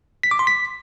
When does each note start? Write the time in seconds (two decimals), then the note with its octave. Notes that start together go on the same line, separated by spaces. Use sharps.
0.23 B6
0.31 D6
0.39 C6
0.47 B6